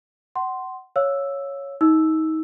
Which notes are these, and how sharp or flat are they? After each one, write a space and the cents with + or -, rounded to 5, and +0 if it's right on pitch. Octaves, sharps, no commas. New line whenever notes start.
F#5 +25 C6 +0
C#5 +0 F5 +0 E6 +0
D#4 +30 E6 +0